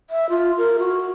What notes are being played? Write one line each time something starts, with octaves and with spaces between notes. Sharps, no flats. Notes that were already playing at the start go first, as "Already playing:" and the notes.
E5
F4
A#4
F#4